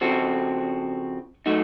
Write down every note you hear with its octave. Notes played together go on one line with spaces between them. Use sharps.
C#3 F3 C4 F#4 A4
F#3 A3 D#4 F#4